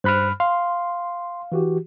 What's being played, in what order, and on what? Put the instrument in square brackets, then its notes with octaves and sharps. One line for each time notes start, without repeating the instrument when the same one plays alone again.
[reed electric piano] G2 B5 F6 [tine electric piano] C5 F#6
[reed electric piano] F5 [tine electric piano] C6
[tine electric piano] E3 F#4 G4